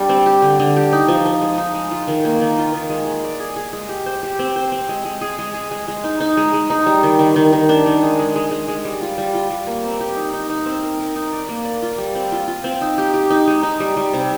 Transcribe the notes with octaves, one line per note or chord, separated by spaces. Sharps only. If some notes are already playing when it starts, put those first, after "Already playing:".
Already playing: G3 D4
C4
G4
D3
D3
G4
D#4
F3
F3
G#3
D#4
G#3
F4
D#3
A#3
D#3
F4
D#3
G#3
G#3
D5
G#4
G#4
G#3
G4
C5
G4
C4
C5
C4
G#3
G#3
G#4
G#3
G#4
G#3
G#3
D#4
D#4
G#3
G#3
D#4
G3
D#3
D#3
D#3
D#3
D4
D#3
G#3
G#3
G#3
G#3
G#3
G3
F4
G3
F4
G3
A#3
C4
G4
D#4
D#4
D#4
C4
A#4
A#4
D#4
D5
A#3
D5
F4
G3
C4
F4
F4
C4
D#4
G4
G4
D#4
G#3
D#4
G3
G3
C3